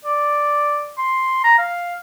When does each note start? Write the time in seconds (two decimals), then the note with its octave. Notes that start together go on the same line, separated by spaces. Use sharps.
0.05 D5
0.98 C6
1.44 A#5
1.59 F5